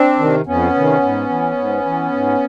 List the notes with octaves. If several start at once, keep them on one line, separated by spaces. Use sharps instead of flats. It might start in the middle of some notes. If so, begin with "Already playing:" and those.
Already playing: C4 D4
C3 D#3
F2 B3 C#4
C3 D#3
G#2
E3
G#2
E3
G#2